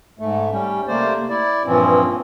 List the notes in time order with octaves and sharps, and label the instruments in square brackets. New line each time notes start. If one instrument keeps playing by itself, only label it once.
[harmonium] G#2 A3
G3 C#4
C3 A3 A#3 C5 D5
E4 D5
G2 A#2 E3 F3 C4 C#4